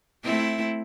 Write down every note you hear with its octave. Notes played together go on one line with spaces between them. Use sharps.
A3 C4 E4